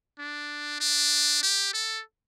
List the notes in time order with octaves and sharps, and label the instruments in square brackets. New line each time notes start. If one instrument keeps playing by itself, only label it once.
[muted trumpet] D4
D4
G4
A4